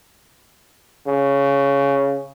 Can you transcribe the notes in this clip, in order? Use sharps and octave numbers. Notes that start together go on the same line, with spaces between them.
C#3